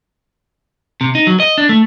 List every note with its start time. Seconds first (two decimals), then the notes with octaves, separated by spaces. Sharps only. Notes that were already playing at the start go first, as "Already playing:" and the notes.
1.01 C3
1.15 D#4
1.27 F#3
1.40 D#5
1.58 D4
1.69 A3